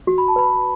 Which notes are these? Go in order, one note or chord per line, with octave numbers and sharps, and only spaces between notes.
F#4
B5
A5
B4 B5